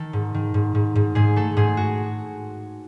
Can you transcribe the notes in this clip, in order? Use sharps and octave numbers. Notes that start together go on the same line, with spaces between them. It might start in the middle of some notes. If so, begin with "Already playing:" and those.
Already playing: D#3 A4
G#2
D#3
G#2
G#2
G#2
G#2 G#4
A3 A4
G#2 G#4
F#4